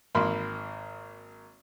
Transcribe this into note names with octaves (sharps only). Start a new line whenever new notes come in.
G#1 A#3 B5 C6